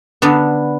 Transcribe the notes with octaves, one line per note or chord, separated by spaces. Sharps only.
D3 B3 D4